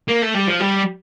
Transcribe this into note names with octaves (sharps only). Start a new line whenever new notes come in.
A#3
A3
G3
F3
G3